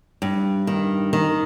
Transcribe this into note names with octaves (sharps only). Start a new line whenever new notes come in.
G2
D#3
D#3